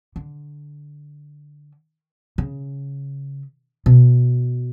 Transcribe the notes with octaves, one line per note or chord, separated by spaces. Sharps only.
D3
C#3
B2